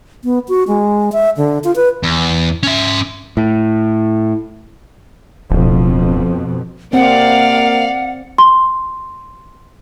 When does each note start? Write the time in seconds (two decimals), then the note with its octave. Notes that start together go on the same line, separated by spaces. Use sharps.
0.24 B3
0.49 F#4
0.68 G#3
1.13 E5
1.37 D3
1.64 F4
1.76 B4
2.03 E2
2.63 C#4 E5
3.37 A2
5.51 D1 F2 B2
6.93 C3 A#3 C4 D5 F5 F#5
8.38 C6